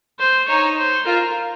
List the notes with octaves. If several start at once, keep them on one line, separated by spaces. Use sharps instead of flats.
C5
D#4 C#5
C5
F4 A#4